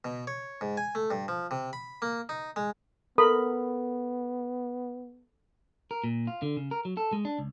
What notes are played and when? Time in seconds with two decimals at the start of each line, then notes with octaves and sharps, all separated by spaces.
0.05 B2
0.27 C#5
0.61 G#2
0.77 G#5
0.95 A3
1.11 G2
1.28 F3
1.51 C3
1.73 B5
2.02 A#3
2.29 D#4
2.56 G#3
3.18 B3 A4 A#4 B5
5.91 A#4
6.04 A#2
6.27 F4
6.42 D3
6.57 C#3
6.71 A#4
6.85 F#3
6.97 A4
7.13 G#3
7.25 D4
7.39 C#2